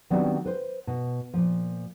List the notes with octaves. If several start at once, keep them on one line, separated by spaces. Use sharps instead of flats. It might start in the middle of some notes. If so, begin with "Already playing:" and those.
D#3 F#3 G3 B3 C4 D4
B4 C5
B2
A#2 F3